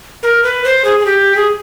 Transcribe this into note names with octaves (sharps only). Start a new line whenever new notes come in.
A#4
B4
C5
G#4
G#4
G4
G#4